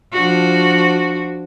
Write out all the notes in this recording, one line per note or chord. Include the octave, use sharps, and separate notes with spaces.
F3 D4 F#4